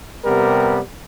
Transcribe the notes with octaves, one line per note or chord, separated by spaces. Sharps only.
C3 G3 B3 A#4